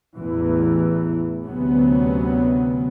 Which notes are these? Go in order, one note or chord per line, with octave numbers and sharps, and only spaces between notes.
A1 E2 E3
D2 C3 F#3 B3 C#4